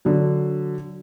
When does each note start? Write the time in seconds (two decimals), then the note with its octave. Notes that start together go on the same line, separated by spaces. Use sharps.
0.05 D3 F#3